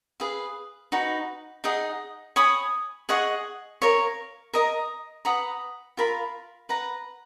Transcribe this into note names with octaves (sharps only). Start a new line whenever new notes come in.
G#4 B4 F5
D#4 F#4 B4
D#4 G#4 D#5 F#5
C#5 G#5 B5 D#6
G#4 D#5 F#5 C#6
A#4 C#5 F5
A#4 D#5 A#5
B4 F#5 A#5 D#6
F4 A#4 F5 B5
B4 F#5 A#5